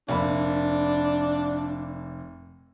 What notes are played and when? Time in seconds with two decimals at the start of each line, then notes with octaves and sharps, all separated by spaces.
0.09 F1 A#3 D4 B5